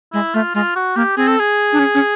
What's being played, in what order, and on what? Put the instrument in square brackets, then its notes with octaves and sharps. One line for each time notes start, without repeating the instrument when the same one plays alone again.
[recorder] G#3 [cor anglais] E4
[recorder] A3 [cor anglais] F4
[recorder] G#3 [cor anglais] F4
[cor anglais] F#4
[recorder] A#3 [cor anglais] G4
[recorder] C4 [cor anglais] G#4
[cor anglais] A4
G#4
[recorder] D4
C#4
C#4